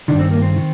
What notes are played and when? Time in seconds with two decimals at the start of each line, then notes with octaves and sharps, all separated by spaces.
0.08 G2 D#3 D4
0.19 C4
0.31 A#3
0.42 C4
0.58 D#3